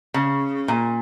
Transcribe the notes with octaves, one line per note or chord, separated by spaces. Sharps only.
C#3
A#2